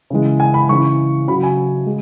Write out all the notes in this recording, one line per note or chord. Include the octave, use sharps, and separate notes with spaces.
C#3 E3 G#3
G#5
B5
C#3 E3 G#3 C#6
C#3 F#3 B5
G#5
G#3